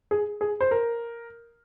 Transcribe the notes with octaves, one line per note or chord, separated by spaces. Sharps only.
G#4
G#4
C5
A#4